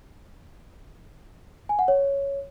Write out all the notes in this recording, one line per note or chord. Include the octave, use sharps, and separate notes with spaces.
G#5
F#5
C#5